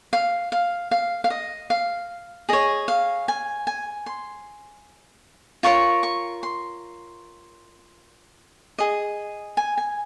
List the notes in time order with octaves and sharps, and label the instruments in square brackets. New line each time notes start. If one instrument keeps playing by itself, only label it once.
[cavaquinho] F5
F5
F5
F5
D#5
F5
G#4 C#5 D#5
F5
G#5
G#5
C6
F4 A#4 C#5 C#6
C#6
C6
G#4 D#5
G#5
G#5